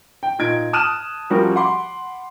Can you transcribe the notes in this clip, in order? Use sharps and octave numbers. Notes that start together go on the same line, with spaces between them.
G5
A#2 D#4 G#6 D7
A5 D#6 F6 F#6 D#7 E7
F3 G3 C#4 F#4 G4 A#4
F#5 B5 C6 D6